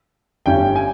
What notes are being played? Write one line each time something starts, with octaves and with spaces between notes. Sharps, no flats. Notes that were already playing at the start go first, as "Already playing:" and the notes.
G1 G2 G3 C#4 G5
G#5